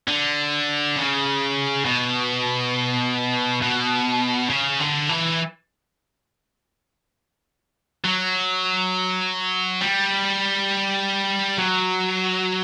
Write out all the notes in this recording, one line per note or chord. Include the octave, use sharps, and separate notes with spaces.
D3
C#3
B2
B2
C#3
D3
E3
F#3
G3
F#3